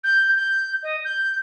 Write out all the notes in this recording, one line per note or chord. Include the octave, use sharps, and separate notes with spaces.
G6
G6
D#5
G6